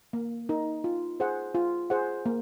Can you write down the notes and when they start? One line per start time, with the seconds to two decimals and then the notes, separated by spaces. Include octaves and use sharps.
0.13 A#3
0.49 D#4 A#4 D#5
0.84 F4
1.20 G#4 C5 F#5
1.55 F4
1.90 G#4 C5 F#5
2.26 A#3